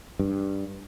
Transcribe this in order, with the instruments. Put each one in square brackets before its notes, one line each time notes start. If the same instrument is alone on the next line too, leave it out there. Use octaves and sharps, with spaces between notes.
[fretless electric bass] G2